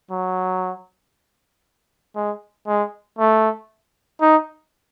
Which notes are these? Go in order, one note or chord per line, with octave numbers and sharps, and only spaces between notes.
F#3
G#3
G#3
A3
D#4